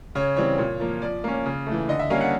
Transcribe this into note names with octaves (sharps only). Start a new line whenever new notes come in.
C#3 C#5
E3 G3 C4 C#5
A#2
F3 A#3
F3 D5
A#3 C#4
C#3
E3 A3
D3 D#5
E5
G3 A#3 C#4 F5
F#5